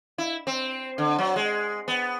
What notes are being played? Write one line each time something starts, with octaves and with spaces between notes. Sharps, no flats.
E4
C4
D3
F#3
G#3
B3